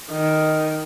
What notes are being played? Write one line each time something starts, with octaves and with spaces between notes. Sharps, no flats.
D#3